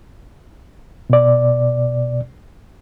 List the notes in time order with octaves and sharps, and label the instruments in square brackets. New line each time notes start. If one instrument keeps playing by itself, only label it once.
[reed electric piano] B2 D5